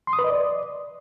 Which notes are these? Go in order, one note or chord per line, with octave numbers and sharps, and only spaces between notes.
C6
D#6
B4
D#5
D5